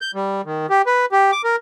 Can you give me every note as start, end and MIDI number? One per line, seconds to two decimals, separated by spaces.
0.01 0.11 91
0.15 0.41 55
0.45 0.66 51
0.70 0.82 67
0.86 1.05 71
1.12 1.31 67
1.32 1.42 86
1.44 1.56 70